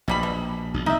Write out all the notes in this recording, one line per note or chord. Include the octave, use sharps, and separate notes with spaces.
A#1 B2 G3 B5
B2
A#1
C2 D#4 E5